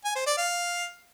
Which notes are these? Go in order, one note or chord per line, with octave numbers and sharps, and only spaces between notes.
G#5
C5
D5
F5